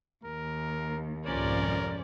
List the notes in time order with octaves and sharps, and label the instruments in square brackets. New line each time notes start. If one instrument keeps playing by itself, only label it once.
[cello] D#2 [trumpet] A#4
[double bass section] C2 F2 G#2 [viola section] F3 C#4 D5 [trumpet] A#4